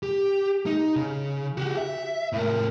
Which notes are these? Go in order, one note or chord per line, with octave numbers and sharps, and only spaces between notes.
G4
D#4
C#3
F#4 G4
E5
A2 A#4